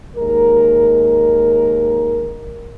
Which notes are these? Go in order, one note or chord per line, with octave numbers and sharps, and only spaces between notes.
D#2 G#3 A#4